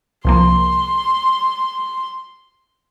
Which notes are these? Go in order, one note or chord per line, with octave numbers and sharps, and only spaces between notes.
C2 F3 A#3 C6